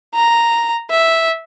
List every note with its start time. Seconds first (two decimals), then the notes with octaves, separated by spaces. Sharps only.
0.15 A#5
0.90 E5